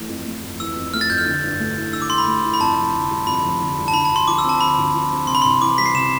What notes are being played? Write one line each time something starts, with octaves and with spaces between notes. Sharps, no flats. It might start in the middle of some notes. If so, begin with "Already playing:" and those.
Already playing: E3 A3
F2
A3
F2
E3 E6
F2
A3 F6
A6
F2 G6
F6
D3
G2
A3
E4
D3 E6
D6
G2 C6
B5
A3
E4
B5
F2 A5
F1
D3
G3
F2 B5
F1
D3
G3
A5
D3 B5
A5
D2 C6
F3 D6
E6
C4
A5
D3 B5
D2
F3
C4
C3 C6
B5
C6
C2
E3 D6
G3 B6
C7
C3 E7